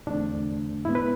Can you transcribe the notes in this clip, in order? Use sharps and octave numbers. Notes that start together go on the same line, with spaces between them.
E2 D3 A3 C4 D4
G#2 G#3 B3 E4
B4